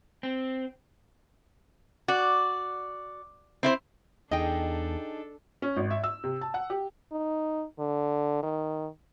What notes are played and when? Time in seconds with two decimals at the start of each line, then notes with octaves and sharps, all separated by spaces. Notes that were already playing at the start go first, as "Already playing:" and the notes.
0.23 C4
2.08 F#4 D5
3.63 C4 E4 C5
4.31 E2 D4 D#4 G#4 A4 D#5 G5
5.62 C#4
5.77 G#1
5.90 E5
6.04 E6
6.24 C3
6.41 A5
6.54 F#5
6.70 G4
7.12 D#4
7.79 D3
8.43 D#3